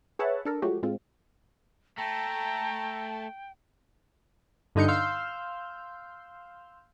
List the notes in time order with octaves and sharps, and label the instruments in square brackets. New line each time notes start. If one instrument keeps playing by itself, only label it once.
[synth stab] G#4 B4 C#5 E5 F#5 A5
D4 A4 A#4
F3 F#3 G#3 A3 F#4 G4
A2 G#3 C4 F4
[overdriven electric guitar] A3 [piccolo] G5 [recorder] A5 [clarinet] A#5
[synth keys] G2 D3 D#4 G6 C#7
F5 C6 E6 F6 G6